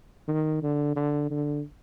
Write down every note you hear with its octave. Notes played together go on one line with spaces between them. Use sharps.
D#3
D3
D3
D3